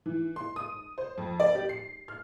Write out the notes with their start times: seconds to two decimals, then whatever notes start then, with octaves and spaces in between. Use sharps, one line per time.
0.06 E3
0.36 C6
0.56 D#6
0.98 C5
1.18 F2
1.40 D5
1.55 G4
1.69 C7
2.08 F6